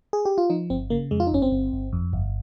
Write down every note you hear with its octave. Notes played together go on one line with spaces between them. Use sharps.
G#4
G4
F4
F3 D#4
G1 C4
C#3 A#3
F2 G#3
F4
D#4
G1 C#4
C4
G1
G1
F2
G1